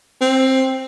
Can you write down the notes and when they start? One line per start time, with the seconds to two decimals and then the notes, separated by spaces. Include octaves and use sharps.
0.21 C4